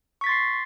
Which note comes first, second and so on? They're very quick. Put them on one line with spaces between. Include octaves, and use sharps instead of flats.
C#6 B6 A6 C6 C7